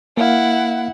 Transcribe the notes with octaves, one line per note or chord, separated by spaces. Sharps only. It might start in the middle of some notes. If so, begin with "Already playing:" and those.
A#3 E4 F5 F#5